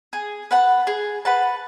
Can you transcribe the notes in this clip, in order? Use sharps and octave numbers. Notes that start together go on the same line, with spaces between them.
G#4
B4 F#5 A5
G#4
B4 F#5 A5